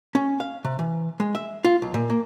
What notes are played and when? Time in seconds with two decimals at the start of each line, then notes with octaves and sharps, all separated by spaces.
0.15 C#4
0.40 F5
0.64 C3
0.79 E3
1.20 G#3
1.35 E5
1.65 F4
1.82 B1
1.94 A#2
2.10 A#3